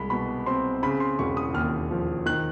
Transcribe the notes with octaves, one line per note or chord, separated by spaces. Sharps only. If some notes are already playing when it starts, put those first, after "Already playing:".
Already playing: C2 G#3 B5
B2 B5
C4 C6
C#3 B5
C6
E1 C#6
D#6
D#2 F6
F3
D#3 F#6